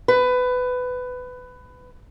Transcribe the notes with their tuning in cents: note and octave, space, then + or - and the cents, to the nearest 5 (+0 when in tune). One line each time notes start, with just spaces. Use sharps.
B4 +20